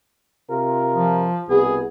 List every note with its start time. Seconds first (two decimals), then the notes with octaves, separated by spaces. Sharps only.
0.50 C3 F4 A#4
0.95 F3
1.49 C2 B2 B3 G#4